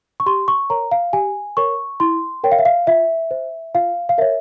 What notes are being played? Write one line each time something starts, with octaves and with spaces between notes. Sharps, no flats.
C#6
G4 C6
C#6
A#4 C#5 A#5
F5
G4 G#5
A#4 C#5 C#6
E4 C6
A#4 C#5 G5
F5
E5
F5
F4 E5
C5
F4 F5
F5
A#4 C#5 E5